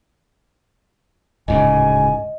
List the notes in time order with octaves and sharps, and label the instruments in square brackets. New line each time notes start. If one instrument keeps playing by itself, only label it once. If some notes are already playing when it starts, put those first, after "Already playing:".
[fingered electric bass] D1 G#2 C#3 [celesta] D#5 [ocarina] G#5